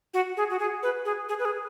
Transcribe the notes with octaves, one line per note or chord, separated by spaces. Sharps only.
F#4
G#4
F#4
G#4
B4
G#4
G#4
B4
G#4